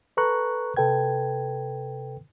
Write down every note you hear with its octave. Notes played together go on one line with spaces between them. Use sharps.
A4 B4 A#5 C#6 F#6
C3 A4 B4 G5 G#6